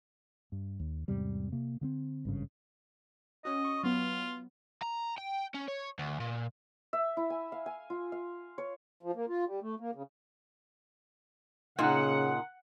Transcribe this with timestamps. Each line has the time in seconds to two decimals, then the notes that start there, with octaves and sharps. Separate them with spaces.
0.52 G2
0.80 D#2
1.08 E2 G#2 C3 G3
1.52 C3 A#3
1.81 D3 B3 C4
2.25 G#1 G2 C#3
3.45 C#4 F#4 D#5
3.65 C#6
3.83 F#3 B3 F4
4.83 A#5
5.18 G5
5.54 C#4
5.68 C#5
5.99 D2
6.20 A#2
6.93 E5
7.17 E4
7.30 G#5
7.52 F5
7.66 G#5
7.90 F4
8.12 F5
8.58 C#5
9.03 F3
9.15 A#3
9.29 F4
9.47 G3
9.62 A3
9.80 A#3
9.95 C#3
11.79 A#2 C#3 D#4 F#5